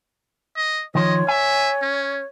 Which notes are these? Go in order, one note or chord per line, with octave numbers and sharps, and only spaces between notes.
D#5
D#3 F3 C#5 D#5
E5 G#5
C#4